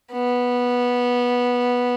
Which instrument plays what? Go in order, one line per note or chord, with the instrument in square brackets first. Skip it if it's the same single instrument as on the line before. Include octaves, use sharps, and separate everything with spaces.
[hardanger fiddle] B3